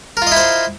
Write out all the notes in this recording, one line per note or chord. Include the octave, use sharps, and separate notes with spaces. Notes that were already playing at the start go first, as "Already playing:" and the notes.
E4 F4 A#4 C5 D#5